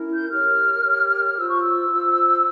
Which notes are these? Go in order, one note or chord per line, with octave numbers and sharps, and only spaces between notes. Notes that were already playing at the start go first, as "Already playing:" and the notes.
Already playing: C#4 E4 A#4
G6
G4 A#4 C#5 F6
G4 A#4 C#5
F4 C5 E6
C#6
E6
F4 C5